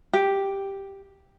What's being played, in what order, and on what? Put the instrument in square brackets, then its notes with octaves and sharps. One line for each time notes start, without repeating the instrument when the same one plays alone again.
[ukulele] G4